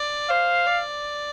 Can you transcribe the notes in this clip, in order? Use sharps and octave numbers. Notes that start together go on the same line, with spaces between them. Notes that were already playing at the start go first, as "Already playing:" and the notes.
Already playing: D5
C5 F5
D5